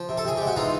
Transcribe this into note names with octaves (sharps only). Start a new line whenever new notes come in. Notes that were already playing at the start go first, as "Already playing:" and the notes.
Already playing: F3
C3
A4
C3 G#4
G#3 G4
F#4
E3 D#4 F4